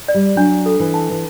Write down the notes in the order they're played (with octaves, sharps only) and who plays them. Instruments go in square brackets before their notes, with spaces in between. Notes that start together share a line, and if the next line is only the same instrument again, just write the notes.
[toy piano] D5
[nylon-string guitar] G3
[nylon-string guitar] F#3 [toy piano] D4
[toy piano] A4
[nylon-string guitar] E3
[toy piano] A5
[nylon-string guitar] E3